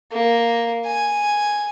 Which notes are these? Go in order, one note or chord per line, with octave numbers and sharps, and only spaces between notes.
A#3
G#5